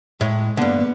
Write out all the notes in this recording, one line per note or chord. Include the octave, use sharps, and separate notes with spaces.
A2 G#3
G2 D3 A#3 B3